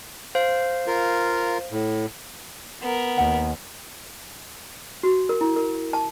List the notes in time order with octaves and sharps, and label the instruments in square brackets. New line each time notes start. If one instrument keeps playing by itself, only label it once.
[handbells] C5 F5
[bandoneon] F4 A#4
A2
[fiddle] B3 A#4
[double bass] D#2 [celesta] F#5
[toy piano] F#4
A#4
E4
A#4
A5